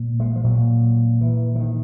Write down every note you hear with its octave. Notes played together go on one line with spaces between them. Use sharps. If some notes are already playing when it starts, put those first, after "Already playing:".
Already playing: A#2
G#3
F3
A#2 F#3
A#2 E3
E3
D#3